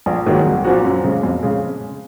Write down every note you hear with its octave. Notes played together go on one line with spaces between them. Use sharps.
A#1
G#2 D#3 F#3 A#3
C2
A#2 F3 C4 F#4
F#2
C#3 G#3
F2
C#3 G#3